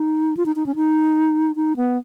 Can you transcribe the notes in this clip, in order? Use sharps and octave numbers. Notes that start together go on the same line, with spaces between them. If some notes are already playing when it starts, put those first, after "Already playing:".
Already playing: D#4
F4
D#4
D#4
C#4
D#4
D#4
B3